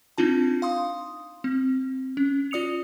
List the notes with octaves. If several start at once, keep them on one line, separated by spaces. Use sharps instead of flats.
C4 D4 D#4 F4 A5
F5 C6 D#6
C4
C#4
F4 D5 D#6 C#7 F7